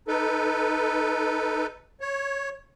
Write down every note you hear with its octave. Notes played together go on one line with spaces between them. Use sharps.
D#4 A4 B4
C#5